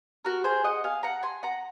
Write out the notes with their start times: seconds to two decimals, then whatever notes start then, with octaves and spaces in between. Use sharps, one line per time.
0.25 F#4 A#4
0.44 G#4 C5
0.64 D#5 F#5
0.84 F5 G#5
1.03 F#5 A#5
1.23 G#5 C6
1.43 F#5 A#5